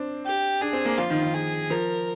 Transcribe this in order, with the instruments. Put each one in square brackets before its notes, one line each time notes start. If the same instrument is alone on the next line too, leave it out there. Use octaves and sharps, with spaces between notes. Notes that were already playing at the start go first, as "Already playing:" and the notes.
Already playing: [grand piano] C4 D4
[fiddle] G4
[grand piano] D4 [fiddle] G#4
[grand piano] C4
A#3
[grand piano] F3 [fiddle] F4
[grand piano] D#3
D#3
[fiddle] G#4
[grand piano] F3 [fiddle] A#4